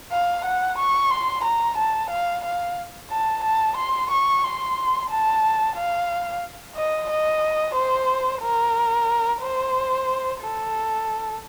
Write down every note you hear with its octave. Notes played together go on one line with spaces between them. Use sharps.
F5
F#5
C#6
C6
A#5
A5
F5
F5
A5
A5
C6
C#6
C6
A5
F5
D#5
D#5
C5
A#4
C5
A4